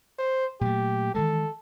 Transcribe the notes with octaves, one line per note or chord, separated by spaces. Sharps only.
C5
A#2 F#3 A3 G4
D#3 E3 G#3 A4